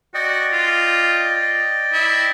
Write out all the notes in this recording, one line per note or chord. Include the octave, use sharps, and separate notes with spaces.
F#4 D5 D#5 G5
F4
E4